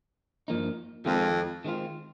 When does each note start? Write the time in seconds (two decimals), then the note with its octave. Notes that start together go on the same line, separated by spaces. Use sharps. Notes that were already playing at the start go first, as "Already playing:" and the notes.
0.48 G2 F3 A#3 D#4
1.06 F2 D#3 G#3 C4 F4
1.65 D#3 G#3 C4 F4